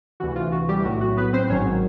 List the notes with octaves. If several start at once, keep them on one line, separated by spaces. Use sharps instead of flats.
D2 C3 E3 F#4
F4
F#4
G3 G4
B1 A2 F#3 F#4
F#4
B3 B4
C4 C5
G#1 G#2 D#3 F#3 C#4 C#5